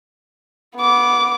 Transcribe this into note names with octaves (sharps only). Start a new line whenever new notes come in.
B3 D6